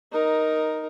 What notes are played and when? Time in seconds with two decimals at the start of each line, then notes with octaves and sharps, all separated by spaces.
0.12 D#4 A#4